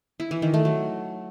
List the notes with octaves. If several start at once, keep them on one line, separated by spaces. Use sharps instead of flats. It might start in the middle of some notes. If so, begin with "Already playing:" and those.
E4
E3
D#3
A3
F#3